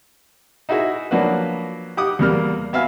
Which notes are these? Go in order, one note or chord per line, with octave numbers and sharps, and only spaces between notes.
D#4 E4 F#4 G#4 E5
F3 F#3 A#3 D4 F#4 B4
G4 F#5 D6 D#6
E2 G3 A#3 F6
B3 F#4 E5 F5 G#5 F6